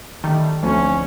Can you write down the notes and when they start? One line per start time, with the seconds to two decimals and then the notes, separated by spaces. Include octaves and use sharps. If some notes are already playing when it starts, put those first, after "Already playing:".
0.24 D#3 G3 A3
0.63 D2 F3 A3 C4 C#4